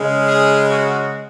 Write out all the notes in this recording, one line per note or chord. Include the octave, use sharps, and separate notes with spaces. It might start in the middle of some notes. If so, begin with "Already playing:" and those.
Already playing: C#3 G#3
G#4
F#4